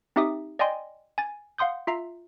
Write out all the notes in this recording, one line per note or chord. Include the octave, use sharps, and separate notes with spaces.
C4 D#4 G4 E5 D6 D#6
D5 D#5 G5 G#5 C6
G#5 A6
F5 F#5 C6 D#6 G6
F4 E5 A#5 C7